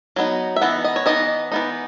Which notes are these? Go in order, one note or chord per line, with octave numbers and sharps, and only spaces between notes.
F#3 B3 D#4
E5
E3 B3 D#4 F#5
D#5
C#5
E3 B3 D#4 D#5
E3 B3 D#4